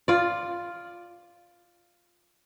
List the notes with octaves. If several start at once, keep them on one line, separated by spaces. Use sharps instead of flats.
F4 D5